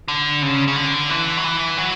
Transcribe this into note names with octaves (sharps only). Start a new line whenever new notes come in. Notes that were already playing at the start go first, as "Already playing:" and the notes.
D3
C#3
C#3
D3
E3
F#3
E3
F#3